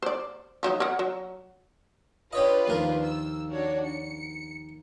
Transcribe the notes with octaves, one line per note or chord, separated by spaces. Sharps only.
C5 D5
F3 F#3 D#4
A#4 C#5 F#5
F#3
D4 F4 G4 B4 C#5 D#5
D#2 F3 A#4
E6
D4 F#4 C#5
C#7